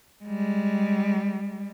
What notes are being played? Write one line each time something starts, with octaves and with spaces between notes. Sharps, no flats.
G3 G#3